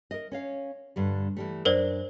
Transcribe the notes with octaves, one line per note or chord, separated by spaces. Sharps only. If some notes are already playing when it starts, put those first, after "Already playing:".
A#4 D#5
C#4 C#5 F5
G2 D3 G3
E3 G3 A3
F#2 D4 A#4 C5 D5 D#5